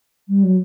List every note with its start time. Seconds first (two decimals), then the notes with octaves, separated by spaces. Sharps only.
0.28 G3
0.43 F#3